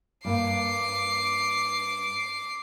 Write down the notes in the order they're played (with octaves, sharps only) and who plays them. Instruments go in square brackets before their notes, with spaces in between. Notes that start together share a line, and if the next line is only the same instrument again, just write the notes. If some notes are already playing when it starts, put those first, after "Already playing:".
[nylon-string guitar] G2 A#3 F5 [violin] D6 C7